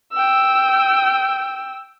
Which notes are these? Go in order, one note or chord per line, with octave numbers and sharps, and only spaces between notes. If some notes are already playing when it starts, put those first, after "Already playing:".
G5 E6